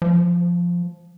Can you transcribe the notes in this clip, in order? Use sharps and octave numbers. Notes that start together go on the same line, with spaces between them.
F3